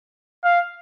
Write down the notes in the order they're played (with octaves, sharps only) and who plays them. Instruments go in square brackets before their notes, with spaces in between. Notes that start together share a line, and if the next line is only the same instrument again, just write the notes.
[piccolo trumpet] F5